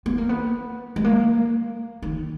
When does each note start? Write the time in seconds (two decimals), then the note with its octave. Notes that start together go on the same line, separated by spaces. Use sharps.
0.06 B3
0.18 A#3
0.29 B3
0.96 G#3
1.04 A#3
2.02 D#3